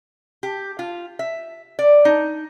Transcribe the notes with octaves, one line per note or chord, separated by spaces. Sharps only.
G4
F4
E5
D5
D#4